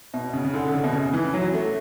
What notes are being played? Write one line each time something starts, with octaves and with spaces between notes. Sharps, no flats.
B2
C#3
C#3
D3
D3
C#3
B2
C#3
E3
F#3
A3